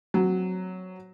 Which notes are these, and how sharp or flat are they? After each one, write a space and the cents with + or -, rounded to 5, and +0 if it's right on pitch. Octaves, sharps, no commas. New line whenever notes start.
F#3 +0 C4 +0